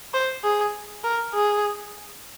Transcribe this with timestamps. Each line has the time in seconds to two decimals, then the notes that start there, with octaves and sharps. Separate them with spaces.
0.14 C5
0.44 G#4
1.04 A#4
1.34 G#4